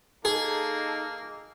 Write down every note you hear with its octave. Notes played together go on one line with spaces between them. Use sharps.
A#3 D#4 G#4 A4